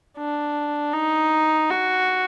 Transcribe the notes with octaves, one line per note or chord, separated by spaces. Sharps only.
D4
D#4
F#4